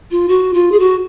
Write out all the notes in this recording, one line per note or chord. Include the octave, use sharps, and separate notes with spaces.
F4
F#4
F4
G#4
F#4